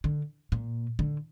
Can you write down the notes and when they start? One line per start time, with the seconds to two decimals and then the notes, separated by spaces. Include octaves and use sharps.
0.04 D3
0.52 A#2
0.99 D3